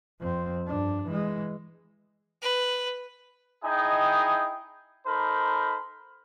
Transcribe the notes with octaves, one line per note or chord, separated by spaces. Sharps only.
F2 C4
G2 D4
E3 G#3
B4
D#4 E4 G#4 D#5 G5
D#4 A4 A#4 C5 B5